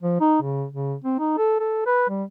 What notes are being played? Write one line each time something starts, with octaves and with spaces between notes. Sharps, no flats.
F3
D#4
C#3
C#3
C4
D#4
A4
A4
B4
G3